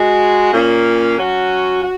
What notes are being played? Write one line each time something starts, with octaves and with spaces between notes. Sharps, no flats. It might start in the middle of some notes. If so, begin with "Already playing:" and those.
Already playing: G#3 F#4
A#2 A#3 C#4
F#3 C#4 F#4
F#4